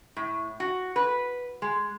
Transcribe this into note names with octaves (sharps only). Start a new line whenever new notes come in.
A2
F#4
B4
G#3